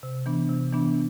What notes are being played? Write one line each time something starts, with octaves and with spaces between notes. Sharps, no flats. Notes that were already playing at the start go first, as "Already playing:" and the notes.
C3
E3 B3 D4
C3
E3 B3 D4